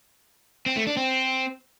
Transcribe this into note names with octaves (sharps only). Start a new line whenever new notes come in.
C4
A3
D4
C4